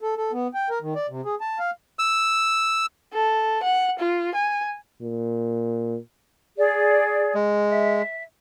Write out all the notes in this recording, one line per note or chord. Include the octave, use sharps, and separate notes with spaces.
A4
A4
B3
G5
A#4
D#3
D5
C3
G#4
A5
F5
E6
A4
F#5
F4
G#5
A#2
G#4 D5
G#3
E5